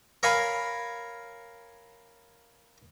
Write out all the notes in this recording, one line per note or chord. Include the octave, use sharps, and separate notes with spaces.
A#4 C#5 F5 G#5 B5